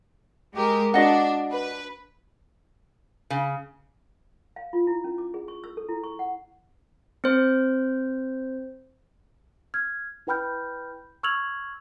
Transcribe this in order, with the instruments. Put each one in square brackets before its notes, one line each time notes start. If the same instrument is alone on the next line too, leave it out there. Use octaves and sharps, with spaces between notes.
[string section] G#3 G4 A#4
[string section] D4 [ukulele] F#4 D#5 F#5
[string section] B4
[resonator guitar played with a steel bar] C#3
[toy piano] F5
F4
E4
C#4
D6
G#4
C#6
E6
A4
E4
C#6
F#5
[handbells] C4 C5
[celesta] F6 G#6
E4 B4 G5 B5 F6 G6
C#6 E6 F6 G#6 F7 F#7